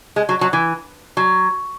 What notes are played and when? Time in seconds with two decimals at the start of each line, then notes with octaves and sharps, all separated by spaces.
0.16 G#3
0.29 F#3
0.41 F#3
0.53 E3
1.17 F#3